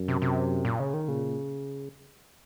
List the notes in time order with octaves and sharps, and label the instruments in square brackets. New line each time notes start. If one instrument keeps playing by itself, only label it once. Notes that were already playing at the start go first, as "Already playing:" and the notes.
Already playing: [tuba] F#2
[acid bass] C3
C3
A#2
C#3
D#3
[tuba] A#2 [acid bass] C#3